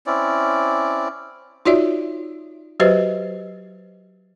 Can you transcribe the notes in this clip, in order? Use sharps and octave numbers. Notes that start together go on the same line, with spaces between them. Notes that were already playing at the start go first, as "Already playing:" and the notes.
C4 C#4 E4 D5
D#4 F4 F#4 C#5 D5 E5
F#3 F#4 G4 B4 C5 D#5